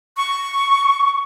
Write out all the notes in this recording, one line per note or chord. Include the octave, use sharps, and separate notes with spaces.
C#6